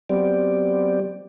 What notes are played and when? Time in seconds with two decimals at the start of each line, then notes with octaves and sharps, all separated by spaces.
0.10 F#3 B3 C4 G4 D5